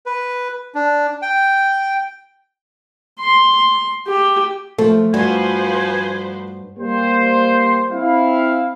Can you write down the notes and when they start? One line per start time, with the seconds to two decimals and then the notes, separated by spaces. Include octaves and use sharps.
0.06 B4
0.75 D4
1.22 G5
3.20 C6
4.07 G4
4.78 F3 A3
5.14 G2 F3 F#4 B4 C5 G#5
6.78 G3 A#3 G4 C5
7.92 C4 E4 F5